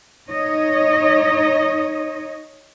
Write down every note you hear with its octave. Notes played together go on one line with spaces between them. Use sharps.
D#4 C#5 D#5